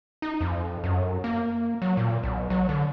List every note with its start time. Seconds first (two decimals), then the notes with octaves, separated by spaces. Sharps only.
0.22 D#4
0.41 F2
0.84 F#2
1.24 A#3
1.82 F#3
1.97 A#2
2.23 B1
2.50 F#3
2.69 D3